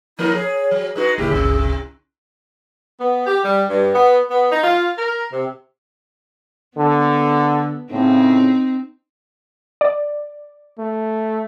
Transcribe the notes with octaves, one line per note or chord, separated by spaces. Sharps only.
F3 A#3 E4 A#4
G#4 C#5
F#3
G#3 D#4 F#4 B4
D#2 A#2 D3 E4 G4 G#4
G1 C#2 C3
B3
G4
G3
G2
B3
B3
D#4
F4
A#4
C3
D3 B3 A4
A2 C#3 C4 D#4
D5
A3